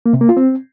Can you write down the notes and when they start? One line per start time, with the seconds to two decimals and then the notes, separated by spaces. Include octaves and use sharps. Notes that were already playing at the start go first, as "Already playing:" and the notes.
0.06 A#3
0.13 C3
0.21 A#3
0.29 F4
0.37 C4